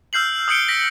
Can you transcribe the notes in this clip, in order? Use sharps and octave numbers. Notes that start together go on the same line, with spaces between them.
E6 F6 G6 C7 F#7
D#6 E6 G6 C#7 D7 G7
A#6 B6 D7